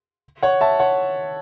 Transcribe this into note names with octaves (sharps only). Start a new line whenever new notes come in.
C#5 F#5
E5 A5
C#5 F#5